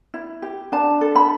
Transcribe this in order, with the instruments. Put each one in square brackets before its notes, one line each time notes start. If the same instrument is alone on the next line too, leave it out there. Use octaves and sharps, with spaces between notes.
[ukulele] E4
G4
D4 A5
A4
B5